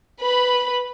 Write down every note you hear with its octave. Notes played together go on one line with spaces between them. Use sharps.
B4 B5